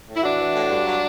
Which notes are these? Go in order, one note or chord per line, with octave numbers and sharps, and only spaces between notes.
A2
E4
E3 D4 F#4
E3
A2
G2
F#3